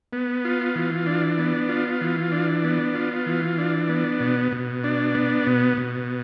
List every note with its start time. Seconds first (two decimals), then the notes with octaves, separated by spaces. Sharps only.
0.13 B3
0.45 F4
0.75 E3
1.07 D4
1.39 B3
1.69 F4
2.01 E3
2.32 D4
2.64 B3
2.95 F4
3.26 E3
3.58 D4
3.89 B3
4.20 B2
4.52 B2
4.84 D4
5.15 B3
5.46 B2
5.77 B2